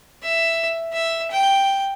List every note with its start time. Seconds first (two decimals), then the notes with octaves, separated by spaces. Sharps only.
0.23 E5
0.93 E5
1.31 G5